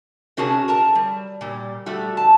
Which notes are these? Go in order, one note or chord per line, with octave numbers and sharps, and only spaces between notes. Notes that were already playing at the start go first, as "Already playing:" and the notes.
C3 C#4 F#4 G#4 A#4 A5
A#4 A5 A#5
G3
A#2 G3
G3 A3 F#4
A5